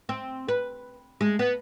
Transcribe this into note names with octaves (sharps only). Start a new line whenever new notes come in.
C4
B4
G#3
B3